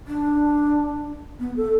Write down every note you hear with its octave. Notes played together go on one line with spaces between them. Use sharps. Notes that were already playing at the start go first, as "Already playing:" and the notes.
D4
B3
A4